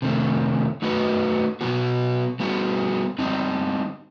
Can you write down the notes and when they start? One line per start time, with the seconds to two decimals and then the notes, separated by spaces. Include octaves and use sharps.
0.02 C3 D#3 A3
0.82 A3 D#4 F#4 B4
1.61 B2 F#3 B3 F#4
2.40 G3 B3 F#4
3.19 G3 C4 D#4